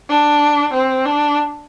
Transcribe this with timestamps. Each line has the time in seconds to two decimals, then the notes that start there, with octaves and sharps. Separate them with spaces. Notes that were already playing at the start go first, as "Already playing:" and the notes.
0.10 D4
0.74 C4
1.06 D4